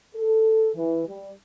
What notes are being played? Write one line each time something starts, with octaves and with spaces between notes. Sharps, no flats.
A4
E3
G3